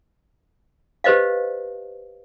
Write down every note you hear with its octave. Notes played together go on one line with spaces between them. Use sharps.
G4 B4 C5 D#5 F5